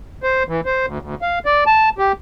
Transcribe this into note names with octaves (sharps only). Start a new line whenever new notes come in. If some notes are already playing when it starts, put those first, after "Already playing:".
C5
E3
C5
D2
D2
F5
D5
A5
G4